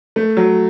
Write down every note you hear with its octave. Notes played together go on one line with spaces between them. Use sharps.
A3
F#3